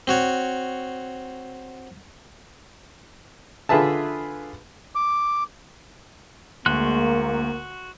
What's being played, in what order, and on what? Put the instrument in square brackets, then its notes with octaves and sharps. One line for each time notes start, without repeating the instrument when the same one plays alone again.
[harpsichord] C4 F#4 C#5
[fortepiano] D3 F4 G#4 B4 E5 A5
[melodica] D6
[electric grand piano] D2 [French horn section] G#3 A#3 [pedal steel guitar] F#4 C6 F#6